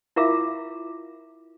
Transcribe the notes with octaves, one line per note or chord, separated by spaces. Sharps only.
E4 F4 A#4 E5 F5 D6